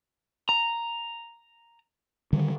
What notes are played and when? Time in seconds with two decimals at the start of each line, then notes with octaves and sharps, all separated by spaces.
0.49 A#5
2.33 D3 D#3 G3